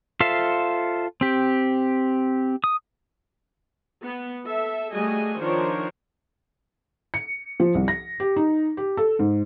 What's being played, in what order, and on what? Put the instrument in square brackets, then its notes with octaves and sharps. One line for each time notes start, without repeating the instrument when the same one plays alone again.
[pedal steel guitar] F4 A4 C5 E5 F5
C4 G4
D#6
[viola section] B3
A4 E5
G3 A3 F#4 G#4 D#5 G#5
D#3 F3 D4 A#4 C5 C#5
[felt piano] C#7
F3
C2
A#6
G4
D#4
G4
A4
G#2